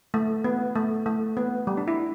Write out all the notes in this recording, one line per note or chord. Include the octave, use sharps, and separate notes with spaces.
A3
B3
A3
A3
B3
G3
D4
E4